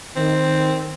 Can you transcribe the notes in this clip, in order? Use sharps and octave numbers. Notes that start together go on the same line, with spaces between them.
D#3 C4